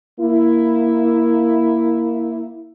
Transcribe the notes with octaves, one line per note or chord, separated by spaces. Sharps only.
A#3 E4